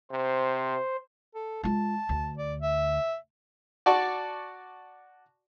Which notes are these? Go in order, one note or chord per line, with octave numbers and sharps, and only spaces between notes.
C3 C5
A4
G#3 F4 A5
D2
D5
E5
F#4 D5 A5 C#6